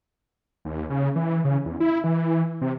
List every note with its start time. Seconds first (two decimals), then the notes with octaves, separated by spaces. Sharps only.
0.65 D#2
0.90 C#3
1.16 E3
1.44 C#3
1.65 E2
1.80 E4
2.04 E3
2.61 C3